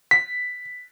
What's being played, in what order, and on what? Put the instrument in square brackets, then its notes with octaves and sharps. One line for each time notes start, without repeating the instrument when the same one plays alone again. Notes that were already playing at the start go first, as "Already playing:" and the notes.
[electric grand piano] B6